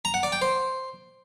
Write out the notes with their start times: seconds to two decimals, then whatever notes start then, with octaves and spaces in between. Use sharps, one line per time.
0.05 A#5
0.14 F#5
0.23 D5
0.32 G5
0.42 C5